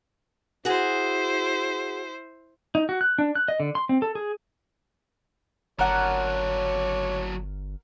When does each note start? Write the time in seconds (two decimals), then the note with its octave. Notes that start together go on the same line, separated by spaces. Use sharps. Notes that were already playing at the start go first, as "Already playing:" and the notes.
0.65 E4 F#4 G#4 C5
2.75 D#4
2.89 F#4
3.01 F#6
3.19 D4
3.35 F#6
3.48 D#5
3.60 D3
3.75 C6
3.89 C4
4.02 A4
4.15 G#4
5.79 G1 F#3 D4 A#4 C#5 F#5